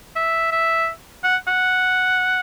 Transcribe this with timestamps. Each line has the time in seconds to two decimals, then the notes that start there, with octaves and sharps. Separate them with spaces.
0.16 E5
0.52 E5
1.24 F#5
1.48 F#5